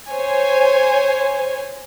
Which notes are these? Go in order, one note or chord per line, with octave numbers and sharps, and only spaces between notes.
C5 C#5 G#5